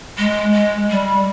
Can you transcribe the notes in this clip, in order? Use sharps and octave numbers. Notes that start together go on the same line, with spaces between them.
G#3
G#3
G3